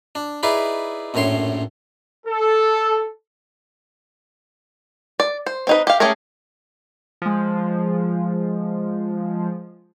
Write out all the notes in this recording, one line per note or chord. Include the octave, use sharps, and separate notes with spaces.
D4
D#4 E4 G#4 B4 D5
A#1 F#2 A2 C#5 C6
A4
D5
C5
C4 D#4 B4
G4 F5
A3 C#4 G4 G#4 A#4
F3 G#3